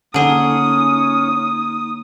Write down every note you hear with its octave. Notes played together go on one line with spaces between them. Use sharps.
D3 A#3 C#4 D#4 G#4 D#6